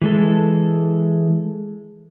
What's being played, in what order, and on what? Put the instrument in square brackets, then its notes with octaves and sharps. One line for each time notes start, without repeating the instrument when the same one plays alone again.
[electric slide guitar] E3 G#3 A4